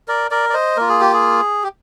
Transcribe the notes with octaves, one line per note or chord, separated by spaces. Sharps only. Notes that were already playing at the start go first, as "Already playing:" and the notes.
A#4 D5
A#4 D5
D5
C5 D#5
A#3 F4 A#4
G#4
G4
G#4
G4